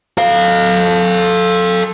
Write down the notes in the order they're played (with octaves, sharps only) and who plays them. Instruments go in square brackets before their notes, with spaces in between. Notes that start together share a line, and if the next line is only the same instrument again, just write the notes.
[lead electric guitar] A4 F5